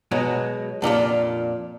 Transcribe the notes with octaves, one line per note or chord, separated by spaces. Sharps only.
B2 F#3 G#3
F2 A#2 D4 F4